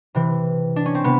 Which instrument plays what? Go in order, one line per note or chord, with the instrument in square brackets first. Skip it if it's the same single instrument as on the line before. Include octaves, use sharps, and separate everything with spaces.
[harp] C3 E3
D4
C#4
C4
C3 B3